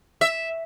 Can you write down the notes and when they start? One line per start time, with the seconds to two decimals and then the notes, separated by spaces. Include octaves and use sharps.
0.21 E5